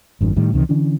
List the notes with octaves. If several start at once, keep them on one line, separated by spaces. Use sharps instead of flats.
G#1 F#2 A2 D#3
A2 D#3 G3
C#2 C3 D#3 E3
D3 E3 C#4 D4